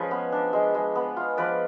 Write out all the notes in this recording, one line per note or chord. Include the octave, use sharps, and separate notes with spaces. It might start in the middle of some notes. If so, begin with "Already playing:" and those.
Already playing: F3 G#3 C#4 G#4 B4
B3
D4
G#3
G#3
B3
F4
F3 B4 D5